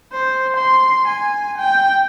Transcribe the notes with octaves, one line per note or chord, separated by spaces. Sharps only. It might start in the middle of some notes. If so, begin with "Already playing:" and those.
C5
C6
G#5
G5